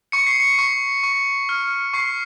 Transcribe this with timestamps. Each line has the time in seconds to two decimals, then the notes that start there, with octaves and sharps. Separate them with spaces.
0.12 C#6 C#7
0.27 C7
0.40 C#7
0.59 C#6
1.03 C#6
1.49 F6
1.93 C#6 C7